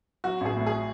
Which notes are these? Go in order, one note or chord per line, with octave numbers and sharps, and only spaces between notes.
F#3 F#4
A1 G#4
A2
G#4